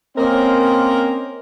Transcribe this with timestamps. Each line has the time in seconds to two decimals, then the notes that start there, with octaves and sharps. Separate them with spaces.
0.17 A#3 C4 C#4 A#4 C5 D#5